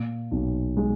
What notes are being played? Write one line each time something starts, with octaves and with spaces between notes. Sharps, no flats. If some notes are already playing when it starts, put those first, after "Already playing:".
Already playing: A#2
B1
G#3